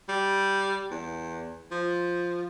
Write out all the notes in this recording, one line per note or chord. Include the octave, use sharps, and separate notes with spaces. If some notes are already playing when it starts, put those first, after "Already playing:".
G3
E2
F3